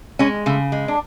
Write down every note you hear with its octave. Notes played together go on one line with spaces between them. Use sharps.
G#3 C#4
C#3 A3
G#3
D4